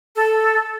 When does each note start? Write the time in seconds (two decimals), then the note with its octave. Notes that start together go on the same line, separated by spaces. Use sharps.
0.16 A4